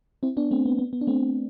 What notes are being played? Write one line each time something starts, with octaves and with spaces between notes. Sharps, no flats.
C4 E4
B3 D4
A3 C4
B3
B3
B3
D4
A3 C4